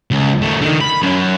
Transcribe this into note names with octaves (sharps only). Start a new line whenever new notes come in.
C#2
D#3 A3
D3 D#3
B5
F#2 F#3